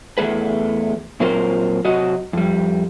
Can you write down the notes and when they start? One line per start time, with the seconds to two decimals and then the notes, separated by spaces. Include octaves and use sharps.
0.18 E2 G2 A3 G#4 B4
1.20 A#2 F#3 C4 F4 A#4 C5
1.84 C3 F#3 F#4 D#5
2.33 F2 G3